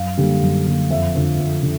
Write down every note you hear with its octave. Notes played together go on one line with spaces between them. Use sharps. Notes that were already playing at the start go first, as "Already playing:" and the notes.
Already playing: F#2 F5
D3 G3 A#3
F#2
D3 G3 A#3
F2 E5
D3 F3
F2
D3